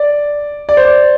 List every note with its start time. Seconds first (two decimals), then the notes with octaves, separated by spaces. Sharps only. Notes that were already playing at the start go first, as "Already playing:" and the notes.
Already playing: D5
0.69 D5
0.77 C5
0.85 D5